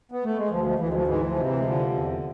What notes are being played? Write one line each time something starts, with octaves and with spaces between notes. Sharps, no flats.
B3
A3
G#3
D2 F3
F3
D2 E3
G#3
F3
G#2 E3 G#3
F3
C3
E3
G#3
D3 F3
E2